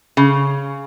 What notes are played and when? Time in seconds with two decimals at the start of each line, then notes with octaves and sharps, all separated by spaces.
0.17 C#3